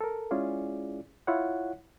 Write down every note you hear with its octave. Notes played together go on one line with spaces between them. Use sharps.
A4 A#4
G#3 C#4 E4 F4 G#4 D5
E4 F4 C#5 F#5